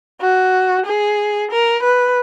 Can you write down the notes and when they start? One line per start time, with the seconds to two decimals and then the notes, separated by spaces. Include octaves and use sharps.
0.21 F#4
0.86 G#4
1.51 A#4
1.83 B4